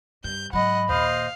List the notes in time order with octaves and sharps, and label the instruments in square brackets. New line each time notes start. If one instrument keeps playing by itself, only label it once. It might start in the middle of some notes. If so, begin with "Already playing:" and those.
[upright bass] G2 [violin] G6
[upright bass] G#2 F#3 [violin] D#5 F#5 [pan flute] B5
[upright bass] D#2 A#2 [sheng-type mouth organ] C5 D#5 [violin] F5